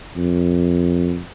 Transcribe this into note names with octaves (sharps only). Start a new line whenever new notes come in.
F2